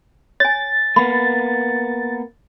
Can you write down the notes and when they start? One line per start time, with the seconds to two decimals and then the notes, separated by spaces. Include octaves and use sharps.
0.40 C#5 G#5 A6
0.96 A#3 B3 B5